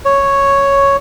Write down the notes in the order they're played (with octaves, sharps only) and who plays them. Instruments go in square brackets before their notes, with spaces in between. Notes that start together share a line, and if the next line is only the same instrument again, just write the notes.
[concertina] C#5